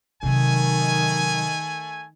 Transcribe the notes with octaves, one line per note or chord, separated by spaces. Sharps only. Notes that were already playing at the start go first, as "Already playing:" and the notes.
C3 D#3 F#3 A3 G#5